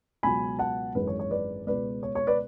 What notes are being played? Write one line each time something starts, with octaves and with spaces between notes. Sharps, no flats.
C#2 B2 F#3 G#5 B5
F#5 A5
G#1 F#2 E3 G#3 B4
C#5
C#5
B4 D5
C#2 B2 G#3 B4 D5
C#5
C#5
B4 D5